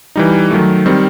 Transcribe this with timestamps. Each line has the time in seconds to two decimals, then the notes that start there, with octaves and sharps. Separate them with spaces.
0.16 E3 G3 D#4
0.51 D#3 F#3 A3
0.86 D#3 G3 C4